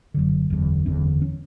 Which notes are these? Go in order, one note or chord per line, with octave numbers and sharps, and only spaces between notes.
F#1 F#2 D3
F#1 E2 D3
F#1 E2 D3 C#4
C#4